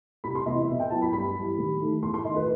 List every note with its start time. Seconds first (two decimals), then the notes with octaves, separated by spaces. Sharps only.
0.24 C2 B5
0.35 C6
0.46 C3 E3 B3 E4 D#5
0.68 B2 E5
0.80 G5
0.90 F#3 B3 E4 A5
1.02 B5
1.13 G2 B5
1.36 E3 G3
1.58 D#2
1.80 D#3 A3
2.03 E2 C6
2.14 C6
2.25 D#3 D#5
2.28 A3
2.36 B4